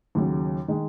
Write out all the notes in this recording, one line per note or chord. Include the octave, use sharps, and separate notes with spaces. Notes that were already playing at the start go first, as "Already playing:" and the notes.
D#2 C#3 F#3
D#3 G#3